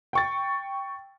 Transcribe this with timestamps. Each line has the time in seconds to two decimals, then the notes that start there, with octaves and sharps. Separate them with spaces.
0.13 G5 C#6 A6